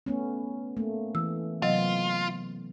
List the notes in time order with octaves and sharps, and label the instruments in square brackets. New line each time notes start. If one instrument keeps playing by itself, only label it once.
[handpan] A3 B3 C#4
A3 A#3
[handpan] E3 [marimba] E6
[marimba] C3 F#3 D#5 [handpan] B3 [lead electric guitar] F4